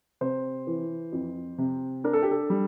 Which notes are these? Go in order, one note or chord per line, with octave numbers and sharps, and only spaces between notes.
C3 C5
E3
F2
C3
D4 A#4
A4
G4
A4
G3